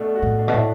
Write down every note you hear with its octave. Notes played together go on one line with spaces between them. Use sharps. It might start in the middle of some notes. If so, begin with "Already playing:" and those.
Already playing: B2 A3 D4
F#4
A2
D4
B2
A2